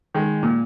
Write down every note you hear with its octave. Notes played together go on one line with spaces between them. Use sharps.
D#3 G#3
A#2